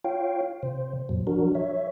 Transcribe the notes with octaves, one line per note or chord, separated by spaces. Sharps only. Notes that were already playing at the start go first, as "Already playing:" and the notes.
F4 C#5 F5 G5
C3 C5
F2 A#2 F#3
F3 F#3 D4 F#4 A#4
C#5 E5